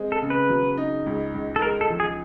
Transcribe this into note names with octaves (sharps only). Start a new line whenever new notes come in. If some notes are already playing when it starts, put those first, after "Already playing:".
Already playing: G#3 C4
A4
C#3
B4
F#3
D#4
C#2
C#2
A4
G#3 A#4
A4
F3
G#4